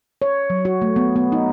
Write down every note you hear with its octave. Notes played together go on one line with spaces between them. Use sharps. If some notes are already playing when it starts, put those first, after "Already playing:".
C#5
F#3
F#4
A3
B3
B3
D#4